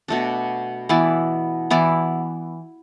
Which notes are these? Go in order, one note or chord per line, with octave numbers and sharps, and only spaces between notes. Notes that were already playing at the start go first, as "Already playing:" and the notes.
B2 A3 D4
E3 B3 E4 D5
E3 B3 E4 D5